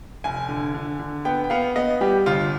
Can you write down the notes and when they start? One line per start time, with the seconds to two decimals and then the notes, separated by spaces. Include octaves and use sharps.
0.24 F1 G#5
0.49 D3
0.75 D3
1.00 D3
1.25 B3 G5
1.44 G5
1.50 B3 F5
1.76 B3 D#5
2.01 G3 G4
2.26 G1 F4